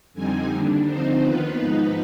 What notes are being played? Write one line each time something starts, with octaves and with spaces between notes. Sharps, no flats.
F2 D3 G3 C4 D#4 G#5
D#2 D3 G3 D4
D3 F3 C4 D#4 C5
D#2 D#3 B3 F4 B4
G#2 F3 B3 D#4